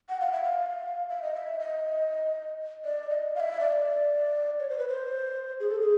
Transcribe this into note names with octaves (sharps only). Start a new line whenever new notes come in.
F#5
F5
E5
F5
E5
D#5
E5
D#5
D5
D#5
F5
E5
D5
C#5
C5
B4
C5
G#4
A4
G#4